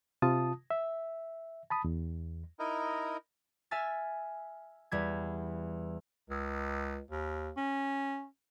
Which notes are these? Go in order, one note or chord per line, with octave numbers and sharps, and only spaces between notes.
C3 F4 A5 D#6
E5
A5 B5 D#6
E2
D#4 E4 A#4 D#5
E5 G#5 F6 A6
E2 G3 G#6
C#2
D#2
C#4